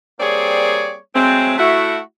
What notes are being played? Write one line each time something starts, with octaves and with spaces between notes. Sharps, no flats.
G3 A#3 C4 G#4 C#5 D5
F#3 G#3 A3 C4
A3 E4 F#4